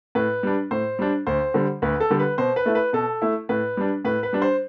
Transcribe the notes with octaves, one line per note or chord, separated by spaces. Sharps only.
A2 B4
G3 D4
A2 C5
G3 D4
D2 C5
D3 G3
D2 B4
A4
D3 G3
B4
B2 C5
B4
A3 E4
B4
B2 A4
A3 E4
A2 B4
G3 D4
A2 B4
B4
G3 D4
C5